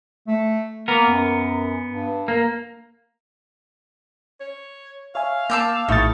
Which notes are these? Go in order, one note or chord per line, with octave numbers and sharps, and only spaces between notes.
A3
A#3 B3 A#4
F#2
G2
A#3
C#5
C#5 E5 F5 G#5
A#3 A5 D6 E6 G6 C7
A#1 A2 D#4 E5 C#6 F6 A6